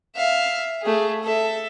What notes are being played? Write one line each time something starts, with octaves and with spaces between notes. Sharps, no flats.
E5 F5
A3 G#4
A4 E5